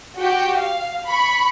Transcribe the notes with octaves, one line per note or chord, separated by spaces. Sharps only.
F#4 G4 G5
F5
B5 C#6